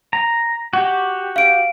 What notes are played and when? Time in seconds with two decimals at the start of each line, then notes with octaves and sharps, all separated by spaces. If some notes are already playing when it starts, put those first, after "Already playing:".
0.13 A#5
0.73 F#4 G4
1.36 F5 D7